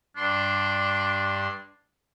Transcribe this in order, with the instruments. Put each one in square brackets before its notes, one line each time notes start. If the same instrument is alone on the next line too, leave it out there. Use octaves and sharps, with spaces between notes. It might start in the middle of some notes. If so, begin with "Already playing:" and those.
[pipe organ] G2 C6 [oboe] D4